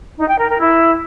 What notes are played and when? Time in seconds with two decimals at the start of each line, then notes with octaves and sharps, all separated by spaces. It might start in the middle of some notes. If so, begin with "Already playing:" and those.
0.18 D#4
0.28 G5
0.38 A#4
0.48 A#4
0.59 E4